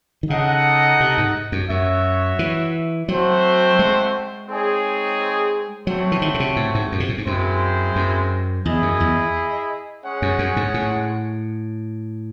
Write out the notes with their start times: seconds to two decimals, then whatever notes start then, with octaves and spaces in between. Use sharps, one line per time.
0.23 D#3
0.30 C#3 D#4 A4 D#5 F#5
1.00 C3
1.18 G#2
1.52 F#2
1.70 F#2 F#4 C#5 E5
2.39 E3
3.08 F#3 A3 C4 F#4 C5
3.79 G#3
4.48 C4 D#4 G#4 C#5
5.87 F#3 A3 C4 F#4 C#5
6.12 E3
6.22 D#3
6.34 C#3
6.40 C3
6.56 A2
6.75 G#2
6.92 F#2
7.00 C3
7.09 A2
7.18 G#2
7.27 F#2 G#3 C4 E4 C5
7.96 F#2
8.65 E2 E4 G#4 D#5
8.82 F#2
9.00 E2
10.05 G#3 C#4 G#4 C#5 F#5
10.22 F#2
10.39 F#2
10.56 G#2
10.74 A2